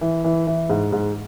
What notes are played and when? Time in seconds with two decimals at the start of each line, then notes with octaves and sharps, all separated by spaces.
0.01 E3
0.24 E3
0.47 E3
0.70 G#2
0.92 G#2